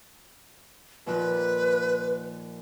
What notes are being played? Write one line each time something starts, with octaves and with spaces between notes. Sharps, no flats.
D#2 A#2 F3 B4